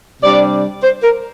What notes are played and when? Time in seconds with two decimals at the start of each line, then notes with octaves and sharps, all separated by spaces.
0.23 C3 G3 D4 D5
0.83 C5
1.03 A#4